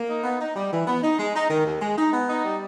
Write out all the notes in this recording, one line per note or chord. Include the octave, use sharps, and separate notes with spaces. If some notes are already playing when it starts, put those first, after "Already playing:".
Already playing: A#3
D#4
B3
D#4
G3
E3
B3
D#4
G#3
D#4
D#3
D#2
G#3
D#4
B3
D#4
G3